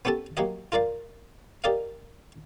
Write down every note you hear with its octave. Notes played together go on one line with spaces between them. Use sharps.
B3 C#4 G4 A4 A5
F#3 A#3 G4 D#5
F4 A#4 D5 F5
G4 A#4 D5 D#5 F5